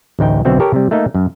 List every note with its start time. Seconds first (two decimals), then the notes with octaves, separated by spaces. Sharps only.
0.19 A1 D2 D#4 G5
0.45 B1 D3 C4 F#4 E5
0.60 G4 A4 A#4 C#5
0.73 C3 G3
0.91 A3 A#3 D#4
1.15 F#2